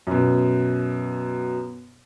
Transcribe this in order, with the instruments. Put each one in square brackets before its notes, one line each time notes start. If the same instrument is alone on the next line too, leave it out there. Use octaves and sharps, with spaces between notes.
[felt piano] F#2 B2